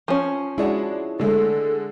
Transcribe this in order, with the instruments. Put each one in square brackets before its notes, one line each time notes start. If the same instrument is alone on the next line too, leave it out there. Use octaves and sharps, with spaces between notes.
[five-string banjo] F3 C#4
[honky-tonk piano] G#3 D4 F#4 [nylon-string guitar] E4 G#4 C#5
[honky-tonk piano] D3 G#3 A3 [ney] A4